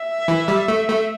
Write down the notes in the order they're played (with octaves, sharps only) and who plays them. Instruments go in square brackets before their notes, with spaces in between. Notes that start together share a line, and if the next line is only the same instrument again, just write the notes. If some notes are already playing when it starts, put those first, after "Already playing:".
Already playing: [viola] E5
[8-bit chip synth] E3
G3
A3
A3